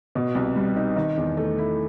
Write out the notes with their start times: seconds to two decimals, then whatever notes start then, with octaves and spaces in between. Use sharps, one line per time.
0.15 B2
0.35 C2
0.56 G3
0.76 D#4
0.96 D#3
1.17 E2
1.37 A3
1.58 E4